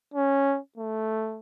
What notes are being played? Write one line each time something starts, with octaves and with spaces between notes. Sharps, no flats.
C#4
A3